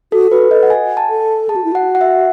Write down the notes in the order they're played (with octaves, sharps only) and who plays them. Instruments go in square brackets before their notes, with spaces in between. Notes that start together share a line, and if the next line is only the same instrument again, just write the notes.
[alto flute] F#4 [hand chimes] A4
[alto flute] F#4 [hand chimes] B4
[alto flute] A4 [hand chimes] D#5
[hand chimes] F#5
G#5
A5
[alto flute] A4
[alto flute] G#4 [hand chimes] A5
[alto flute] F#4
E4
[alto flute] F#4 [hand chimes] F#5
[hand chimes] F#5
E5